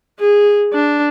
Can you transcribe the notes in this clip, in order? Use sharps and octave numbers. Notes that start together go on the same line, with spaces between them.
G#4
D4